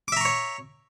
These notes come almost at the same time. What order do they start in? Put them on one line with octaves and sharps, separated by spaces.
D6 E5 A#5 C#6 C#5